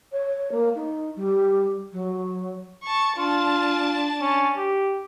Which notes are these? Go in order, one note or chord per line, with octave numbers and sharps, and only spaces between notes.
C#5
A#3
D#4
G3
F#3
A5 C#6
D4 F4 A5
C#4
G4